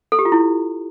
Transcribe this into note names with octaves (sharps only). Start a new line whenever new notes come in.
A4
G4
F4
E4